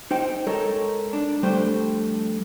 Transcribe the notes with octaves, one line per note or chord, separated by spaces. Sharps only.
D#4 C5 G5
G#3 D#4 A4 A#4 C#5
D4
F2 G3 A3 D4 C5 G5